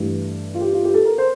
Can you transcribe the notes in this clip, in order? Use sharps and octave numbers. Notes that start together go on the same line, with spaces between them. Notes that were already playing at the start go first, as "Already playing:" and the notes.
Already playing: G2 E3 A3 G4
F4
G4
F4
G4
A4
A#4
C5